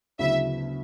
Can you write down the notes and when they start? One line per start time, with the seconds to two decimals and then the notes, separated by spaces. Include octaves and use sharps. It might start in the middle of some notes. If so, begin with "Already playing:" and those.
0.19 D2 C#3 F#3 B3 E4 E5